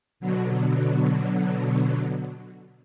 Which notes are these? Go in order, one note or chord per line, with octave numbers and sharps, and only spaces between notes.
B2 D3 F#3